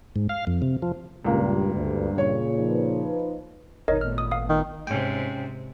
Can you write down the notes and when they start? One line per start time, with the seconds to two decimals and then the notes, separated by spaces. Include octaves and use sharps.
0.16 G#2
0.29 F5
0.47 F2
0.62 C3
0.82 F3
1.24 C#2 G2 A#2 A#3
1.74 D2 G2
2.18 A#2 C#3 C#5
2.58 F3 D#4 B4
3.88 G#1 D#2 B2 D#4 A#4 C#5 D#5
4.01 A#2 A3 B3 F6
4.18 D#6
4.31 F5 D#6
4.49 D#3
4.87 G#2 C3 C#4 G5